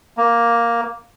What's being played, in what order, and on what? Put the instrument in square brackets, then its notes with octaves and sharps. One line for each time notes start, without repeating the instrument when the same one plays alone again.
[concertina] A#3